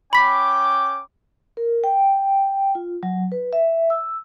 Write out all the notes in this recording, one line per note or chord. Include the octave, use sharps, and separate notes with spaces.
C#4 G5 B5 D6 B6
A#4
G5
F4
F#3
B4
E5
E6